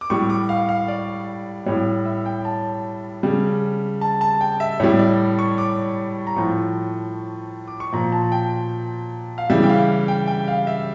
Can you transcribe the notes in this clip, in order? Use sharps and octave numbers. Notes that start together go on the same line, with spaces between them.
D6
A2 G3 C#6
D6
F5
F5
D5
A2 G3 C#5
E5
G5
A5
C#3 G3
A5
A5
G5
E5
A2 G3 C#5
D5
C#6
D6
A#5
A2 F3 C#6
D6
C#6
A#2 F3 A#5
A5
G5
F5
C#3 E3 G3 E5
G5
F5
G5
G5
F5
E5